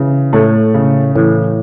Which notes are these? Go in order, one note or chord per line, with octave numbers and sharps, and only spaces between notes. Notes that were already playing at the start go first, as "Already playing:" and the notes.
Already playing: C#3 E3
A2 A3
C#3
A2 E3